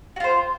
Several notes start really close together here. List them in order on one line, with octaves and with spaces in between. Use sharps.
F#4 F4 C5